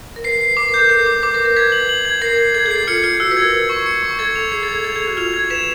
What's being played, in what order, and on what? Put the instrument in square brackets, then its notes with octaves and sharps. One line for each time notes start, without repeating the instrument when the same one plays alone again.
[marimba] A#4
[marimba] B4 [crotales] C7
[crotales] C7
[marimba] B4 [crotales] D6
[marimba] A#4
[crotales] G6
[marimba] A4
[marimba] A#4 [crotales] C7
[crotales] D6
[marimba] B4 [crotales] D6
[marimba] A#4
[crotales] D6
[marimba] A#4
[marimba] B4 [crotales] G#6
[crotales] F#7
F#7
G#6
[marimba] A#4 [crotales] C7
[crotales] C7
[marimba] A4 [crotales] G#6
[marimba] G#4
[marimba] A4 [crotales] C7
[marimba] F4 [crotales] C#7
[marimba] F4 [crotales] C#7
[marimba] F#4 [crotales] E6
[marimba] B4
[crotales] G#6
[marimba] A#4
[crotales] E6
C#6
C#7
C#6
[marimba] A4 [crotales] G#6
[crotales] F7
[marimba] G#4 [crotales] C7
[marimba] A4
[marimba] G#4 [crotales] G#6
[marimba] A4 [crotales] F7
[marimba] G#4
[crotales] F7
[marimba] F#4
[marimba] F4 [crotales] F7
[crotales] G#6
[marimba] B4 [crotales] E7